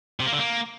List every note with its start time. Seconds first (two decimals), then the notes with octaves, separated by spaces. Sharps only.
0.20 C3
0.26 A#3
0.32 D3
0.39 A#3